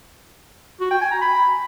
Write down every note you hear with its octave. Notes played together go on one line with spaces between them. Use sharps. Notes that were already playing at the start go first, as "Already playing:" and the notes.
F#4
G5
G#5
A#5
B5